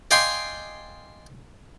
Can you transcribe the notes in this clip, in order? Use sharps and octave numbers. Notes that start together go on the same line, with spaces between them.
D5 D#5 F5 G5 G#5 C6